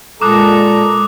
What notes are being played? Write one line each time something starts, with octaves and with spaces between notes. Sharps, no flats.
A#2 G#3 A4 A#5 D6 D#6 F#6